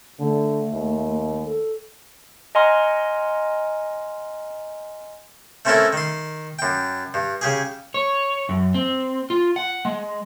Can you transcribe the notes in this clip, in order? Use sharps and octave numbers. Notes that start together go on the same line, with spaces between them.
D3 A3
D#2
A4
D#5 F#5 G#5 A#5 C6 F6
A3 C4 C#4 E4 A4 A#4
D#3 C6
F#2 G5
G2
C#3 G4 G#4
C#5
F#2
C4
F4
F#5
G#3